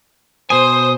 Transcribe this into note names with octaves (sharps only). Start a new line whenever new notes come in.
B2 C5 G#5 D#6